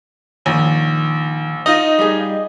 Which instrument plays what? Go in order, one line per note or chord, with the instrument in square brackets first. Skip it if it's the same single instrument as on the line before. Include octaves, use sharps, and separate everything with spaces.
[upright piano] A#1 [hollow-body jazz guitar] D#3 C#5 G#5
[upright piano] D#4 F4 [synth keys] D#5
[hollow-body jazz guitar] G3 G#4